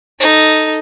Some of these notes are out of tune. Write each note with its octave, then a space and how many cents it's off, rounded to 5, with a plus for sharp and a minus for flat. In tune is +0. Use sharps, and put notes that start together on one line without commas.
D#4 +0 A4 +0